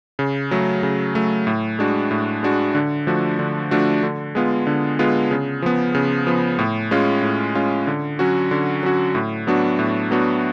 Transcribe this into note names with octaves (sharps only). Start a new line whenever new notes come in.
C#3
F#3 A3
C#3
F#3 A3
A2
G#3 D4 F#4
A2
G#3 D4 F#4
D3
F3 A3 D4 F#4
D3
F3 A3 D4 F#4
D3
G#3 B3 F4
D3
G#3 B3 F4
C#3
F3 B3
C#3
F3 B3
A2
G#3 C#4 F4
A2
G#3 C#4 F4
D3
F#3 C#4 F#4
D3
F#3 C#4 F#4
A2
F#3 B3 D4 F#4
A2
F#3 B3 D4 F#4